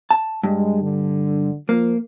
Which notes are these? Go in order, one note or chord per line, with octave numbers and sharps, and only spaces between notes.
A5
G2 G#3
D3
F3 A#3